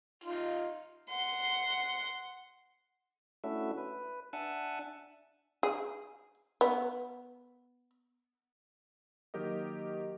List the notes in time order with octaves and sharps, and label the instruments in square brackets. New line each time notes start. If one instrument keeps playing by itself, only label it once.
[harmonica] D#4 F4
[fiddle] F#5 C6
[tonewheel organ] A3 C#4 D4 E4 F#4 E5
B4
D4 E5 F#5 G#5 A5
[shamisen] G#4
B3
[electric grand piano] D#3 F#3 A#3 G4 A#4 D#5